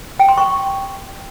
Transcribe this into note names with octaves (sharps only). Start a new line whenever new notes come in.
G5
C6
C#6